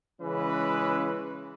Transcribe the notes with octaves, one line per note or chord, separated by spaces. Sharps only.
C#3 E3 G#3 C#4 B4